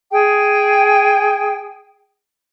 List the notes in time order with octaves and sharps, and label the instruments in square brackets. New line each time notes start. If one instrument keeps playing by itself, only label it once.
[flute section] G#4 G5